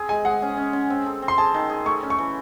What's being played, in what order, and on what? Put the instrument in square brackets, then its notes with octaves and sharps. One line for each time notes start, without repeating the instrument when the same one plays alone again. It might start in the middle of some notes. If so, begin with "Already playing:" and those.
Already playing: [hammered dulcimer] C4 G#4
[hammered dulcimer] G#3 [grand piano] G#5
[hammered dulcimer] G#3 [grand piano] F#5
[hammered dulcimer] C#4
C#4
C#4
C4
A4
C4
[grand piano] C6
[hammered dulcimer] G#4 [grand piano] A5
[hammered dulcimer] D#3
G#4
[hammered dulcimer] A3 [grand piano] C#6
[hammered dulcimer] C#4
[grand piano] C#6
[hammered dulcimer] E3